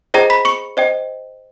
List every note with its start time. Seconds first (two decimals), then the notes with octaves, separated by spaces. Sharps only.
0.14 G#4 C5 D#5 G5 A#5 A#6
0.30 B5 B6
0.45 C#6 C#7
0.77 C5 D#5 G5